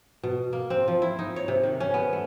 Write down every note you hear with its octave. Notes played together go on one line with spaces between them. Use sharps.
B2
A#3
C4
F3
E4
D#4
C#5
C3
D#3
C#4
B3
A3